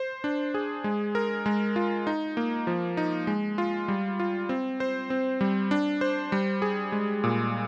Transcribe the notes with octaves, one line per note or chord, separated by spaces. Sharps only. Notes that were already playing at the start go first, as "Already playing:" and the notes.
Already playing: C5
D4
G#4
G#3
A#4
G#3
F4
D#4
A#3
F3
D#4
G#3
F4
G3
F4
C4
C5
C4
G3
D4
C5
G3
G#4
G#3
A#2